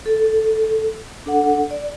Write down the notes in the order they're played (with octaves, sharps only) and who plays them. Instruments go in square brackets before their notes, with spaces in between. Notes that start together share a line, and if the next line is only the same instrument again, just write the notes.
[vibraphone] A4
D4 A4 F#5
D5